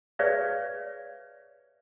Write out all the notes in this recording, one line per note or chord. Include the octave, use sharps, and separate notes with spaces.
G#4 B4 C#5 D5 E5 F5